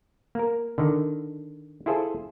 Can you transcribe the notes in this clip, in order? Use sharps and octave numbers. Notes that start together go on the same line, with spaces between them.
A#3 A#4
D3 D#3
E4 F4 G#4 A4 C5